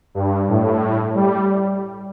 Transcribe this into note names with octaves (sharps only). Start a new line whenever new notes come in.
G2
A2
G3